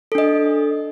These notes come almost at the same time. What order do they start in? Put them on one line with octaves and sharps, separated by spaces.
A4 D4 D#5